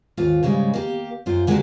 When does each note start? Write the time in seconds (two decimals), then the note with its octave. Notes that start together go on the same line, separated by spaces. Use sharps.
0.17 D#2 G#2 F4
0.43 G#2 C#3 G3 G#3
0.74 A#3 G4
1.26 F#2 F4 C5
1.47 D3 G#3 A#3 C4 F#4 G4